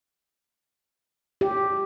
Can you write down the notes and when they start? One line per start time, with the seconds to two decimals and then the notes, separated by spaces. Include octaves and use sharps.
1.41 G4